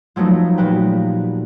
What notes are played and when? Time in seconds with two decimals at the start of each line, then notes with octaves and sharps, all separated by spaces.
0.16 F3 F#3 A3 B3 D#4
0.57 A#2 F#4 G4 B4 G5